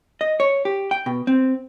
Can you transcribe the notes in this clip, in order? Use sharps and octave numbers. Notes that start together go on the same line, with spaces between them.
D#5
C#5
G4
G5
B2
C4